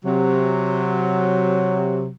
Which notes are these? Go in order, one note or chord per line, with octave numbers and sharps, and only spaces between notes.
C3 F#3